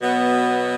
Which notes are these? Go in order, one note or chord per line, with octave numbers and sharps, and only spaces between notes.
B2 F#3 B3